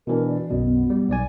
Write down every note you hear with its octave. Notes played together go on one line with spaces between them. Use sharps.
B2 E3 D4 A#4
D5
B1 F#2 B2
B3
G3
B1 D5 G#5